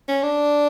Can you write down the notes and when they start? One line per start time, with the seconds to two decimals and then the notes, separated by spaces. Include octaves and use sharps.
0.08 C#4
0.23 D4